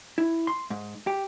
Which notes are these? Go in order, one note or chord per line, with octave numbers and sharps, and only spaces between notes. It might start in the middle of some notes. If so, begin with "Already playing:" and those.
E4
C6
G#2
G4